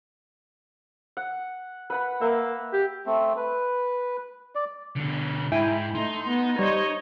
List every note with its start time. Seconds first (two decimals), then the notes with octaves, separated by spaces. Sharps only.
1.17 F#5
1.90 B4 F#5 B5
2.21 A#3 E5
2.73 G4
3.06 A3 C4
3.37 B4
4.55 D5
4.96 B2 D3
5.52 G#2 E4 G5 G#5
5.95 A3 D#4 C6
6.28 B3
6.59 G3 C5 C#5 D#5